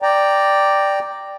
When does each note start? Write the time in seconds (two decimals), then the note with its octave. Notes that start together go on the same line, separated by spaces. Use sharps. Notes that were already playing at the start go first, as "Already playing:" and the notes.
0.02 D5 G5 A#5